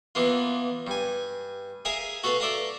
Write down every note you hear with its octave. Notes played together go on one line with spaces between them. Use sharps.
E3 A#3 B3 F4
G2 G#5
G#4 A#4 E5 F5 G#5
F#4 A4 B4 F5
A4 D5 E5 F5 A#5